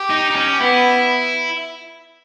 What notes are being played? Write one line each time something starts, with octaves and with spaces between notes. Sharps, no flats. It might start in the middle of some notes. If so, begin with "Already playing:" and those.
Already playing: G4
D#4
D#4
C#4
B3 E4